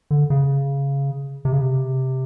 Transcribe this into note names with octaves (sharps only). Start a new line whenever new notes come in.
D3
C#3
C3
C#3
C3